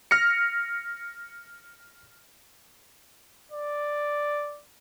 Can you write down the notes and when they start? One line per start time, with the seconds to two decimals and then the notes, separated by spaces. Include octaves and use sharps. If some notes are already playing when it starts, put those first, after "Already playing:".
0.11 F6 A#6 C#7
3.52 D5